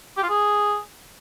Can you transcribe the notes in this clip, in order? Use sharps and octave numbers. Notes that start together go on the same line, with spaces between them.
G4
F4
G#4